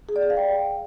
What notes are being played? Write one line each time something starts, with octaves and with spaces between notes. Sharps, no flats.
G#4
D5
G#4
F5
G5